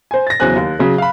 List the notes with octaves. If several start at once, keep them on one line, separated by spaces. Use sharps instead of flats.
C5 G#5
A6 A#6
E2 C#3 F#3 C5 G#5 F#6
D#2
C#3 F#3
F5 B5